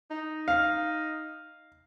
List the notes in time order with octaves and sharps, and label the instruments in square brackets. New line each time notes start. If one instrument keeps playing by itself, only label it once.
[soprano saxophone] D#4
[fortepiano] F5